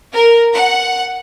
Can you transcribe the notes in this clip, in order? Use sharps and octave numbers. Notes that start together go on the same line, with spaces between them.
A#4
F#5